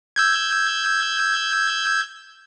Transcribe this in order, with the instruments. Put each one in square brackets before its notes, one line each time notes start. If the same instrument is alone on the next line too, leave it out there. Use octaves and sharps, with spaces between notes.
[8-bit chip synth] E6 G6 G#6